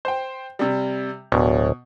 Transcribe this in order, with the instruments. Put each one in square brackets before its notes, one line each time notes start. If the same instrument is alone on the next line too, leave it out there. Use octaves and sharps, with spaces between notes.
[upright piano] C5 G5
C3 G3
[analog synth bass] D1 [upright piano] B2